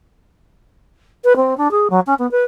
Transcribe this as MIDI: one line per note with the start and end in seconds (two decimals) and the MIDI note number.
1.24 1.36 71
1.36 1.54 60
1.57 1.71 62
1.71 1.88 68
1.90 2.00 54
2.07 2.14 61
2.19 2.30 59
2.31 2.45 71